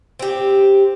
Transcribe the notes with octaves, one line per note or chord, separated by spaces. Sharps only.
C4 G4